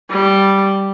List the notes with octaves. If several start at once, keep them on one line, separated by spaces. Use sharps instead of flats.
G3